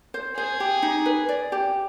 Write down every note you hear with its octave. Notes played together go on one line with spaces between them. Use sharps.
C5
G#4 C5
G4
D#4
B4
D5
G4